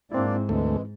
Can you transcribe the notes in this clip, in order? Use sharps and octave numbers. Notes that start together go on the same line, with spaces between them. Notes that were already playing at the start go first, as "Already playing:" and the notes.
G#2 A#3 C4 D4 E4 D5
D2 E3 G#3 A3